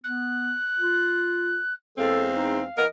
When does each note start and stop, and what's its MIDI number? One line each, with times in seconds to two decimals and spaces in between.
0.04 0.52 59
0.04 1.73 90
0.79 1.58 65
1.98 2.63 40
1.98 2.63 56
1.98 2.63 60
1.98 2.25 69
1.98 2.83 77
2.34 2.61 63
2.78 2.86 52
2.78 2.86 59
2.78 2.86 70
2.78 2.88 75